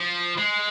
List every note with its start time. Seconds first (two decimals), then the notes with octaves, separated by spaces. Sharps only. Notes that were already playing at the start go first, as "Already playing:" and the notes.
Already playing: F3
0.38 G#3